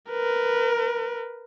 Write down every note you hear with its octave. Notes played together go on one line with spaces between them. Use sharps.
A#4 B4